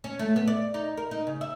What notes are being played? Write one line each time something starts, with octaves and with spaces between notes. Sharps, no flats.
C#4
A3
B3
D5
D#4
A#4
D#4
C#3
E5